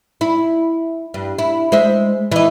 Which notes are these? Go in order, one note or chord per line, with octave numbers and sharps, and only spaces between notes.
E4
G2
E4
G#3 C5 E5
E3 D#4